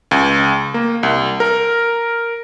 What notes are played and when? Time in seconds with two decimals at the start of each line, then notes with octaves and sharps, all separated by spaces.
0.11 C#2
0.74 A#3
1.03 C2
1.40 A#4